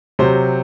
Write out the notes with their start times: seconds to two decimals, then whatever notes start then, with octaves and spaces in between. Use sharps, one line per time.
0.19 C3 F#3 C5